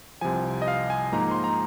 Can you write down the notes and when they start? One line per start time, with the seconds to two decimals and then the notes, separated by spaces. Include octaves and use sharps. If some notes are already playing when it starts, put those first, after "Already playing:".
0.21 C2 C3 F3 G#5
0.62 D#5
0.68 F5
0.90 G#5
1.12 G#2 F3 A#3 D#4 A#5
1.31 C6
1.44 A#5